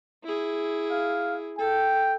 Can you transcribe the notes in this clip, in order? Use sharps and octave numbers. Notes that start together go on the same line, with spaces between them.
E4 G#4
F5
A4 G5